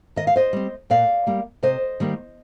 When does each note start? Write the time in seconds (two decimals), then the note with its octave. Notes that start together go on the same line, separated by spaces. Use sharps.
0.16 D#3 D#5
0.27 F5
0.36 C5 D#5
0.53 G3 C4
0.90 A#2 D5 F5
1.27 G3 A#3
1.63 C3 C5 D#5
2.00 D#3 G3 A#3